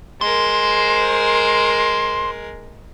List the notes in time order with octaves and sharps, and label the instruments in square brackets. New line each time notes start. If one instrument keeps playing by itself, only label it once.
[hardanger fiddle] G#3 A#4 [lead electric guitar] C5